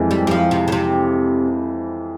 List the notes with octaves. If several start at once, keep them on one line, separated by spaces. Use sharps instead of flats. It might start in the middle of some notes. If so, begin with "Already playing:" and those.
Already playing: F2 E3 G#3 C4 E4
G3
G3
F3
C3
C#3
C3